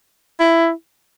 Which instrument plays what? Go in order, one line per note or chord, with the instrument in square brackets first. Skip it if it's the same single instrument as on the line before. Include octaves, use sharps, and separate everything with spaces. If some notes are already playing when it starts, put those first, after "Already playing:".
[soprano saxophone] E4